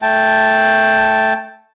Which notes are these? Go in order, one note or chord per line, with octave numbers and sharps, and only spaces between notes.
A3 G5 A5